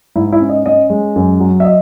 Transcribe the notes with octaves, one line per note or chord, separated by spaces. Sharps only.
G#2 E4
E4
C#4
D#5
C#4 D#5
G#3
F#2
F#3
E5
D#5